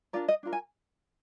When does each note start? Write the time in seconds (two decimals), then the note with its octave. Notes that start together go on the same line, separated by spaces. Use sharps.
0.13 D4 F4 A#4 D5
0.28 D#5
0.43 D4 F4 A#4
0.53 G#5